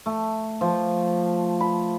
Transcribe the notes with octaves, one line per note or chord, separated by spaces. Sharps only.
A3
F3
B5